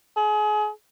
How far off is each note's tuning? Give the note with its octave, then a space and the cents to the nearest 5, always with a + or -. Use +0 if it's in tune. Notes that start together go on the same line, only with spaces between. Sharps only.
G#4 +30